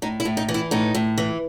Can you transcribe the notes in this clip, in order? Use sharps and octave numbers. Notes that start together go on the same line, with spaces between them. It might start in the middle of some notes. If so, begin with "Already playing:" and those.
A2 D#4
E4
A2
D#4
E3
E4
A2 D#4
A2
E3